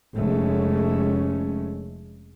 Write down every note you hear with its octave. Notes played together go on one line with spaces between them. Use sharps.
F1 G#3 A3 C#4